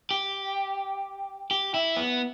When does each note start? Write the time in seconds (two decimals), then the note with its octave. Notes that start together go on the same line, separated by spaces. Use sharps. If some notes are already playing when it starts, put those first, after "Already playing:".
0.11 G4
1.51 G4
1.74 E4
1.97 B3